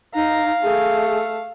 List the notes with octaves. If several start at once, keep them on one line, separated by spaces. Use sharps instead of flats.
D#4 F5 A#5
A3 G#4